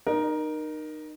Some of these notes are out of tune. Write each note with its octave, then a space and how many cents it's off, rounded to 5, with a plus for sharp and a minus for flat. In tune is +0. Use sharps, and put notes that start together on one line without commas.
D#4 -25 A#4 +15